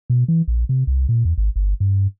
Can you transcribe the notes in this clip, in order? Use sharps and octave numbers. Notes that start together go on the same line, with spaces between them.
B2
E3
A#1
C3
C2
A#2
E2
G#1
G1
G2